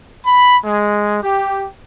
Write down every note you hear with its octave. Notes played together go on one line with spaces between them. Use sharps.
B5
G#3
G4